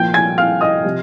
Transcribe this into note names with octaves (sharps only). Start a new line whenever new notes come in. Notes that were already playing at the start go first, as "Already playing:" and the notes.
Already playing: A#2 F3 G5 G6
G#5 G#6
F5 F6
D#5 D#6
C3 F3